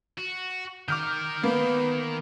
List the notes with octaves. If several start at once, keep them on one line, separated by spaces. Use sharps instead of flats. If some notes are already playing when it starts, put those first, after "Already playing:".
F#4
D#3 A#4 D6 F6 G6
A#3 B3